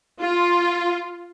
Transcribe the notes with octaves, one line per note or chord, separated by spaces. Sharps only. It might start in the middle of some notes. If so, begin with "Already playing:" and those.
F4